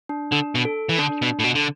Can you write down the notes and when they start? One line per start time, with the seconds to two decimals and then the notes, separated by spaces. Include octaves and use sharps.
0.09 D4
0.32 D3 D4
0.55 B2
0.65 A4
0.89 E3
0.99 D3 D4
1.22 B2
1.39 A2
1.44 B2
1.55 D3